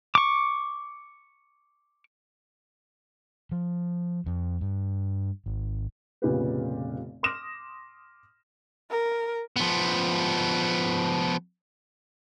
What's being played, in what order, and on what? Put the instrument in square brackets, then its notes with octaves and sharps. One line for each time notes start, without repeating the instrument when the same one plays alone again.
[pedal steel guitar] C#6 D6
[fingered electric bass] F3
F2
G2
G#1
[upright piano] F1 A#2 C#3 B3 G4 B4
C6 D6 D#6 F6 A#6 E7
[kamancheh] A#4
[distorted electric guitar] F3 B3